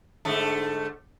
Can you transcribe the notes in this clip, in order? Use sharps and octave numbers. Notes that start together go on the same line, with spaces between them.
G#2 D3 A3